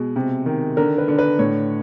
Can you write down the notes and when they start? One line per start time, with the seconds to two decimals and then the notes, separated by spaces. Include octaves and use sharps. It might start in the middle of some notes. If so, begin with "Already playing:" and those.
Already playing: B2 G#3
0.16 C3
0.46 D#3
0.77 D3 A#4
0.98 B4
1.08 D3
1.19 B4
1.39 A2 C#5